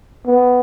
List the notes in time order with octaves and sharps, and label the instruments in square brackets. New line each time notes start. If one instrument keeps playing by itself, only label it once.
[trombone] B3